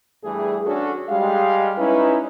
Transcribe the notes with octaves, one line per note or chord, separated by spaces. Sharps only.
G2 E3 G3 A3 G#4
C#4 D4 F#4 A4
G3 G#3 G4 F5
C#4 D#4 E4 B4